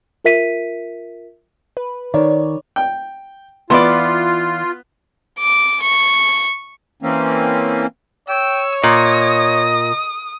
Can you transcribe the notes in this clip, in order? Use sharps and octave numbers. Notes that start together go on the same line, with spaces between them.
F4 A#4 E5 B6 D#7
B4
D#3 C#5 D5
G5
E3 B3 F4 B4 D5 C6
D6
C#6
E3 A#3 C4 C#4
C#5 G5 E6
A#2 D#5 D#6